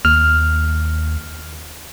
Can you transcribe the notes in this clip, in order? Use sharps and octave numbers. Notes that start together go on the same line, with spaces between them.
D#2 F6